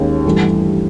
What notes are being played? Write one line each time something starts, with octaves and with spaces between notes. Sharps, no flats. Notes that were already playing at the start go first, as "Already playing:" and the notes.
Already playing: D#2 D#3 G#3 C#4
G2 E3 A3